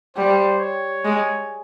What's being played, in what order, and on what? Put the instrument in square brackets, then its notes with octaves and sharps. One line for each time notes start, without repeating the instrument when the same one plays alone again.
[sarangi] G3 [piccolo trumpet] C5
[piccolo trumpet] C#5
[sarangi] G#3